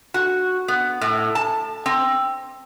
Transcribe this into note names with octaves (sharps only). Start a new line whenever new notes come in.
F#4
B3
A2
A5
C4